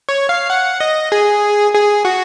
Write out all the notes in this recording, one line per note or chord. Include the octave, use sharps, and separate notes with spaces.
C#5
F5
F#5
D#5
G#4
G#4
F#4